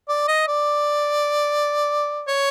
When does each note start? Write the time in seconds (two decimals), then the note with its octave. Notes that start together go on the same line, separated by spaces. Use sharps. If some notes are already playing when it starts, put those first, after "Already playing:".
0.08 D5
0.28 D#5
0.48 D5
2.28 C#5